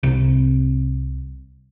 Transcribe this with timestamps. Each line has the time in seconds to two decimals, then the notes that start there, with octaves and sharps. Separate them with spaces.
0.03 C2 C3